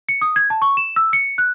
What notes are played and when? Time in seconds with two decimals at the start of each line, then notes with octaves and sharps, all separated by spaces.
0.09 C#7
0.21 D#6
0.36 G#6
0.50 A5
0.62 C#6
0.77 E7
0.96 E6
1.13 C#7
1.38 F#6